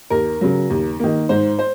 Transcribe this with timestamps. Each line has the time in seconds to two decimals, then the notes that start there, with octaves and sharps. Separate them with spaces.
0.10 D#2 A#4
0.41 C#3 F#3
0.70 D#2
0.99 D#3 A#3
1.29 G#2 C5
1.59 C5